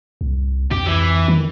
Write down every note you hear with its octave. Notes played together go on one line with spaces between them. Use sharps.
C2
F2 G4
E3
D#3